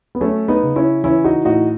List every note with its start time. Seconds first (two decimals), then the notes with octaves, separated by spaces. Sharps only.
0.15 B3
0.21 F#3 A3 C#4
0.48 B3 D#4
0.63 C#3
0.76 C#4 E4
1.03 E3 C#4 E4
1.24 D#4 F#4
1.45 A2 D#4 F#4